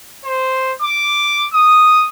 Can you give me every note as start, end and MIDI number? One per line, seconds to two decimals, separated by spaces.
0.25 0.72 72
0.82 1.44 86
1.53 2.08 87